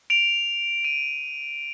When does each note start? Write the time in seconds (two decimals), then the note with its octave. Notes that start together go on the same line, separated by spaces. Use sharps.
0.10 D7 F7
0.84 D#7